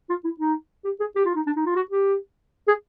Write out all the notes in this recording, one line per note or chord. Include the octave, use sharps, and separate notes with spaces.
F4
E4
D#4
G4
G#4
G4
F4
D#4
D4
D#4
F4
F#4
G4
G#4